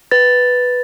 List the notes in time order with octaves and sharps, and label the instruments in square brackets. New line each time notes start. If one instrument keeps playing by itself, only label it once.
[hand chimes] B4 A6